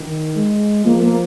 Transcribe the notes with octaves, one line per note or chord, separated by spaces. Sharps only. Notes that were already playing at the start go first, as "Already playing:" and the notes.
Already playing: D#3
G#3
F3 A#3
A#3